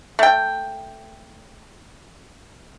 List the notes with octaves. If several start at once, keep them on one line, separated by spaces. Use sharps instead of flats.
A3 G5